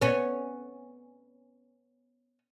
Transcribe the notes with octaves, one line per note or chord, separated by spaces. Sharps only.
B3 C#4